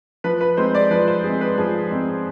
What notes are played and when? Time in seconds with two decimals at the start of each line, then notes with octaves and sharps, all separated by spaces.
0.24 F3 B4
0.41 B4
0.57 G#3 C4 D#4 C5
0.75 D5
0.91 F3 B4
1.08 C5
1.24 G#3 G#4
1.27 C4 D#4
1.41 B4
1.58 F3 G#4
1.91 G#3 C4 D#4